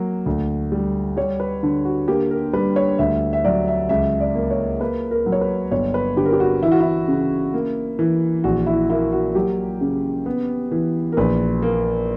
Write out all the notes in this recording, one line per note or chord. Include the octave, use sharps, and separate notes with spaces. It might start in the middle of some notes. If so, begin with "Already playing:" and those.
Already playing: F#3 A#3
D2
G3
G3 C#5
B4
D3
F#4
A#3 G4
A#4
G3 B4
C#5
D2 E5
E5
F#3 D5
E5
C#2 E5
D5
A#3
C#5
A#3 B4
A#4
F#3
C#5
B4
G1 C#5
B4
D3 G4
A#4
G4
F#4
E3 E4
F#4
E4
C#3
A#3
E3
A#1 F#4
E4
A#3 E4
F#4
F#3 G4
C#3
B3
E3
A#4
A#1 B4
A#3